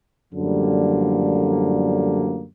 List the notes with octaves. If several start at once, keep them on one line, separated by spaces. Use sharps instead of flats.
F#2 A2 D3 F3 G3 A#3